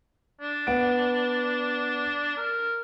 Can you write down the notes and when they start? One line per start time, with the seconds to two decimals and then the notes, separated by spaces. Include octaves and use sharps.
0.41 D4
0.67 B3 F#5 D7
2.37 A#4